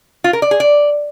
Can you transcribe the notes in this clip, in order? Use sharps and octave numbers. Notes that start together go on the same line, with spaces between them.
F4
A#4
D5
G#4
D5